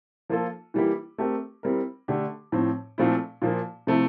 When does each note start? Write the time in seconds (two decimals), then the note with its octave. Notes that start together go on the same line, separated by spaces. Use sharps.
0.29 F3 A#3 F4 A4
0.74 E3 G3 A#3 E4 G4
1.18 A3 C4 G4 A#4
1.63 G3 C4 E4 A#4
2.08 D3 A3 D4 G4
2.52 A2 F3 C4
2.98 A#2 F3 A3 C4 E4
3.42 A#2 F3 A#3
3.87 C3 F3 A3 C4 E4